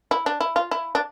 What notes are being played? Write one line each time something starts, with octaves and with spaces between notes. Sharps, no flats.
E4
D4
E4
F4
E4
D4